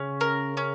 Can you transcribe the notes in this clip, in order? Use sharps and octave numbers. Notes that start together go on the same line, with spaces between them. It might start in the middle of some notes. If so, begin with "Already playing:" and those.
Already playing: C#3 C#4
A#4
C#4